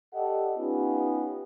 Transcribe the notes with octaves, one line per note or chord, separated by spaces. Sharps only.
G4 A4 D5 D#5 F#5
B3 C#4 D#4 F4 G4